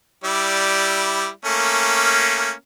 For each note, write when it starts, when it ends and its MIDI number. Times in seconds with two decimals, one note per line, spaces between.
0.24 1.29 55
0.24 1.29 64
0.24 1.29 74
1.45 2.52 57
1.45 2.52 58
1.45 2.52 61